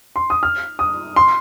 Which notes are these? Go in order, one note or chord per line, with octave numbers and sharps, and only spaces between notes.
C6
D#6
F6
D#6
C6